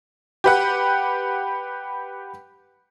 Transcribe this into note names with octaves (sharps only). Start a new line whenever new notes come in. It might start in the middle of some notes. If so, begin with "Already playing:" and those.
G4 B4 F#5